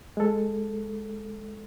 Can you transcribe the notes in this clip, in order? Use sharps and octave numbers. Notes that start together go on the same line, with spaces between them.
G#3 A4